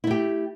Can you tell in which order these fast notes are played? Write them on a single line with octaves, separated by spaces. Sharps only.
E4 A3 G4